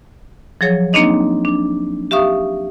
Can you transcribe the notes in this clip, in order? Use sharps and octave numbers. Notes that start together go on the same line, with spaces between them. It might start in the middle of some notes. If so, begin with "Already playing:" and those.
F3 F#3 G#4 C#5
A#3 C4 D4 D#4 D#5
D4
G4 E5 F5 C#6 D#6